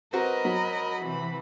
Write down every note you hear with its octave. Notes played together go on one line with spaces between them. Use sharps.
C4 F#4 A#4 B4 D#5
F#3 B5
C3 E3